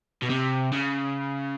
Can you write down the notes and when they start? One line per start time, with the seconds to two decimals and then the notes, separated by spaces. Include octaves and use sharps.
0.22 B2
0.30 C3
0.72 C#3